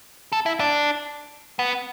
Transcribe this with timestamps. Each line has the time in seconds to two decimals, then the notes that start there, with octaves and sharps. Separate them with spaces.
0.33 A4
0.46 E4
0.60 D4
1.59 B3